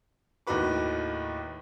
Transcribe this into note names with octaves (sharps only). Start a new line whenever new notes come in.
D#2 A2 D#4 F#4 B4 D6